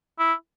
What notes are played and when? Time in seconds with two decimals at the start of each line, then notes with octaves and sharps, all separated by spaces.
0.19 E4